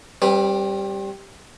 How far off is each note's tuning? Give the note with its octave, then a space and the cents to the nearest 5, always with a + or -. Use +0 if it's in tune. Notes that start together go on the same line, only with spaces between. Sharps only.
G3 +0 C4 +35 B4 +0